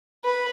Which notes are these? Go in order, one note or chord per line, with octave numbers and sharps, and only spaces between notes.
B4